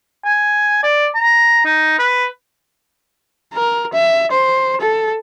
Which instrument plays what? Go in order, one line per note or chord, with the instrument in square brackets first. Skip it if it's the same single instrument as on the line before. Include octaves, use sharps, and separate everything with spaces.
[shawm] G#5
D5
A#5
D#4
B4
[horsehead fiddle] A#4
E5
C5
A4